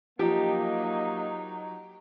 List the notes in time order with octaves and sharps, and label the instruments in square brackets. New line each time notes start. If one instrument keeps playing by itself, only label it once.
[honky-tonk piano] F3 [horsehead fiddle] F#3 D#4 [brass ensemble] A#3 D#5 [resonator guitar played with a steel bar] G4